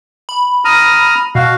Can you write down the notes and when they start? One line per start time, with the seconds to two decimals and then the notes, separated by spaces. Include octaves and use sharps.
0.29 B5
0.65 A#5 D#6 F6
1.35 B2 F#4 F5